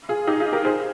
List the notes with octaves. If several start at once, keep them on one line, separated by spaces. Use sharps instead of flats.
F4 G#4
D#4 G4
F4 G#4
G4 A#4
G#4 C5